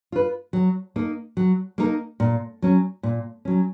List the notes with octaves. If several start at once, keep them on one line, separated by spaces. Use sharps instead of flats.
F4 B4
F#3
A#3 D#4 A#4
F#3
A#3 D#4 A#4
A#2
F#3 C#4
A#2
F#3 C#4